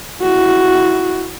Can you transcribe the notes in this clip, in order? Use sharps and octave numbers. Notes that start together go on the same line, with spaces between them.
E4 F#4